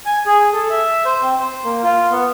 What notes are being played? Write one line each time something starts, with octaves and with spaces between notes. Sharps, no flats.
G#5
G#4
A4
E5
C5
C4
C5
A#3
F4
B3